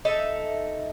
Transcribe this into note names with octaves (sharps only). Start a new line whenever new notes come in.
D#4 A4 E5